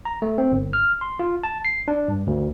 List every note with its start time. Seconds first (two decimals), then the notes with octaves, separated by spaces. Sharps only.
0.05 A#5
0.22 A3
0.38 C4
0.52 G1
0.73 F6
1.01 C6
1.19 F4
1.44 A5
1.65 C7
1.88 D4
2.08 G2
2.27 D2